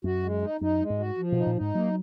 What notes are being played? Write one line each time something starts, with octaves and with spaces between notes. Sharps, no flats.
F#2 F#4
G#3
D#4
F#2 D#4
G#3
G#2
F#4
F3
B2 D#4
A#2
D#4
G#2
F#3 A#3